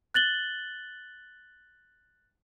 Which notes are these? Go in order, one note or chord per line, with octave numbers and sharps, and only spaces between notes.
F#6 A6 F#7 G7